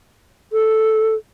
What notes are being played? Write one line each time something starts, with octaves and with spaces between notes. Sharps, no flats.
A4